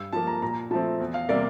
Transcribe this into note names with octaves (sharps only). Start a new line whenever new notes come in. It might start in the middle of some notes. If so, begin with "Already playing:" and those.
Already playing: G2 E6
F3 A#3 A5
A#5
A#2 A#5
F3 A3 C4 A5
E2
F5
C3 G3 A#3 D5